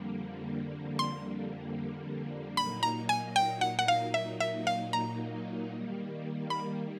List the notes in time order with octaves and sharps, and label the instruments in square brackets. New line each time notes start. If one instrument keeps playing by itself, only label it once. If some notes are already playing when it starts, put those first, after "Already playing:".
Already playing: [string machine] F2 D3 G3 A#3
[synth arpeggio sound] C6
[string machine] A#2 F#3 A#3 D#4 [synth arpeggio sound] B5
[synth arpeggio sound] A#5
G#5
G5
F#5
F#5
F5
E5
E5
F5
A#5
[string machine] D#3 G3 A#3
[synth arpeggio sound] B5